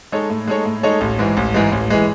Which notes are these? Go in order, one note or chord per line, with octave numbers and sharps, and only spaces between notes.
G#3 D#4 A4 C#5
A2
G#3 D#4 A4 C#5
A2
G#3 D#4 A4 C#5
A1
G#2 E3 G#3
A1
G#2 E3 G#3
A1
E3 G#3